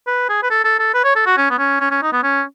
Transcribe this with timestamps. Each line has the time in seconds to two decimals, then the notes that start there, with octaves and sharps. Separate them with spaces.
0.07 B4
0.29 G#4
0.43 B4
0.51 A4
0.65 A4
0.79 A4
0.94 B4
1.04 C#5
1.16 A4
1.26 F#4
1.37 C#4
1.50 B3
1.59 C#4
1.80 C#4
1.91 C#4
2.02 D#4
2.13 B3
2.24 C#4